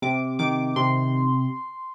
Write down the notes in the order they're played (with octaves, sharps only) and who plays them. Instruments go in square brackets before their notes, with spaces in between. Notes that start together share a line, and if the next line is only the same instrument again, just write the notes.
[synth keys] C3 D6
D#3 D6
C3 C6